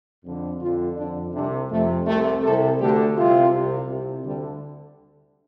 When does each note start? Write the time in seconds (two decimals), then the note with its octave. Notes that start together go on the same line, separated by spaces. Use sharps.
0.24 F2 D3
0.61 F2 D3 F4
0.97 F2 D3 D4
1.34 C2 C3 D4
1.70 F2 C3 A3
2.07 C2 C3 A3
2.43 C2 C3 A4
2.79 D2 D3 G4
3.16 C2 C3 F4
3.52 C2 C3
3.89 C2 C3
4.25 D2 D3 G3